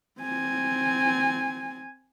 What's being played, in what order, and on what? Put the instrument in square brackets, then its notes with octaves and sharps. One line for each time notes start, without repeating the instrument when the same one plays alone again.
[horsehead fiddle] C4 G#5